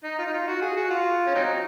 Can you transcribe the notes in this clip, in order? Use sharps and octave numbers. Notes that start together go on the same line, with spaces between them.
D#4
F4
D#4
F4
F#4
G#4
F#4
F4
C#4
F#3 C4 D#4